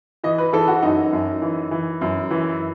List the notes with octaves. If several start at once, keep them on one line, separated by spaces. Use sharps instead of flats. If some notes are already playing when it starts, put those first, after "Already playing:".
E3 D#5
B4
E3 A4
F#4
F#2 D#4
F#2
E3
E3
F#2
E3